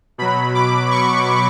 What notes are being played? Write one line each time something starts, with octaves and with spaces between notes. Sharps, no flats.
B2 F#3 B5
D6
C#6